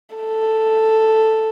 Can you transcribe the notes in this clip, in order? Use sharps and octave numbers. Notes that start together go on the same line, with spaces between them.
A4